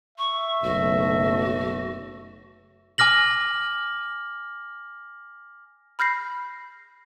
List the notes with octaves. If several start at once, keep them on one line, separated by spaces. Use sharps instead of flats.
E5 C#6
F#1 B1 A3 F#4
G#5 D6 F6 A#6 F#7
B5 F6 G6 A#6 C7